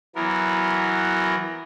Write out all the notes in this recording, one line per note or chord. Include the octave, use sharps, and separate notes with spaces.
E3 F#3 B3 A#4